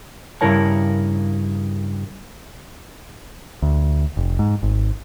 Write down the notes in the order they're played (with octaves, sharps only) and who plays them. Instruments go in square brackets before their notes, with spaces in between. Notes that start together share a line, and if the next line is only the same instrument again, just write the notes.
[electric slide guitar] G2 C#3 E4 A#4 C#5 A5
[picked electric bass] D2
F1
G#2
G#1